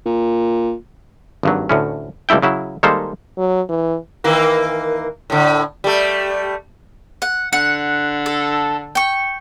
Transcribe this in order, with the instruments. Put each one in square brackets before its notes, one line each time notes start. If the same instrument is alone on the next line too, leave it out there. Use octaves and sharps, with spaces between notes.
[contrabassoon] A#2
[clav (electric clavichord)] G#1 G2 F#3
D2 A2 C#4
C#2 G3 A3 E4 G5
C#3 F#3 E4
D#3 G3 G#3 A#3 A4 C5
[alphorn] F#3
E3
[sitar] D#3 E3 A#3
A2 D3
G3 A3
[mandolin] F#5
[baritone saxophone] D3 [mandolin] F#5
[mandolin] A4
G5 C#6